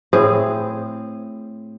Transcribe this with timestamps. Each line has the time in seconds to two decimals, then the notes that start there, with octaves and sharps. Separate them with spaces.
0.13 A2 C4 G#4